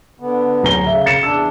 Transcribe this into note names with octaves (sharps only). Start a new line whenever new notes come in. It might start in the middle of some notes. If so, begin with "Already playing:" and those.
D3 B3
D1 A#5 G7
C#3 E5
A6 C#7 E7
E2 D4 E6